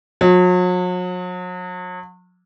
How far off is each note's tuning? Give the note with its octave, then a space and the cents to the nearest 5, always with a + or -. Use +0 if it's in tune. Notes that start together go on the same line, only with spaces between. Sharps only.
F#3 -40